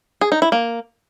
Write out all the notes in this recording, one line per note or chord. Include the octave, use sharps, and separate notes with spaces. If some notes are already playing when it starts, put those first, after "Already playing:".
G#4
D#4
E4
A#3